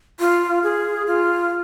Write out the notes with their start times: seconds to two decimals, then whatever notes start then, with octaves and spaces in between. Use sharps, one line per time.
0.20 F4
0.63 G#4
1.07 F4